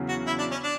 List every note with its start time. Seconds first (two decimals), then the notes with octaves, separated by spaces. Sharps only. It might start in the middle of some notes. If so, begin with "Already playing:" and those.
Already playing: E2 C#3 F#3 C#4
0.09 F#4
0.27 E4
0.39 D4
0.52 C#4
0.63 D4